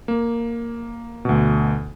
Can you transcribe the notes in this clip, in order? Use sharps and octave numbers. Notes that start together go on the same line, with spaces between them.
A#3
D2 B2